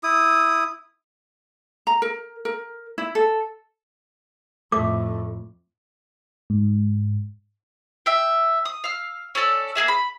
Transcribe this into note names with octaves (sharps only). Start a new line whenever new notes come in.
E4 D#6
A#5
A#4
A#4
E4
A4
F2 A2 A3 D6
G#2
E5 G5
D#6
F5 E6
C#4 A4 D5 E6
A#3 E4 G#4 E5
B5